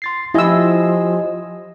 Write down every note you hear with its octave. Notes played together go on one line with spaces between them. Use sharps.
C6 A6 C7
F3 E4 G4 D#5 G#5 E6